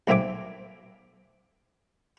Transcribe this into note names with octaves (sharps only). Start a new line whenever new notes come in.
B1 A#3 C4 E5 G#5 D6